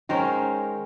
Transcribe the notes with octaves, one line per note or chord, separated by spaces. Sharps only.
D#3 G#3 C#4 A#4 C5